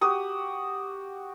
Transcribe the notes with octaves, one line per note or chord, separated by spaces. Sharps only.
F#4 G4 D#6